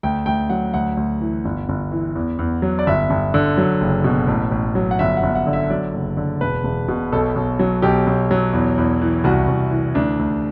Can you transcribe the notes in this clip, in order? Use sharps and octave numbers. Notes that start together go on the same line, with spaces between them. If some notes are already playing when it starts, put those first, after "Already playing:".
D2 G5
D2 G5
F#3 F#5
D2 F#5
D2
E3
G1
G1
E3
E2
E2
F#3
D5
G1 E5
G1
D3
F#3
F#1
B2
A1
A1
F#3
F#5
G1 E5
F#5
G1
F#5
D3
E5
F#3 D5
F#1
D3
E1 B4
E1
B2
B1 A4
B1
F#3
B1 G4
B1
F#3
E2
E2
E3
C2 F#4
C2
E3
D2 D4
D2